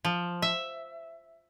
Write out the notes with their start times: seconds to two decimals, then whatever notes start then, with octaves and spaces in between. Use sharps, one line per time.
0.05 F3
0.42 E5